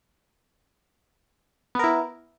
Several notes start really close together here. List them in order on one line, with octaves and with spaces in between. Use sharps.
B3 A#4 E4